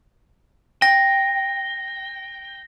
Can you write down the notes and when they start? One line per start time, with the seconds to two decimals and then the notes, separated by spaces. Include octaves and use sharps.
0.82 G5 A#6